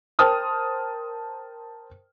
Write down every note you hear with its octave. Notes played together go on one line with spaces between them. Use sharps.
A#4 C5 G5 A5 D#6 F6